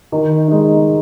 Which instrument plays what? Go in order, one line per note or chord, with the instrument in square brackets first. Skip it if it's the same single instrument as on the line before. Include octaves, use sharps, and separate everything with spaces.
[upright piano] D#3
G#3 D#4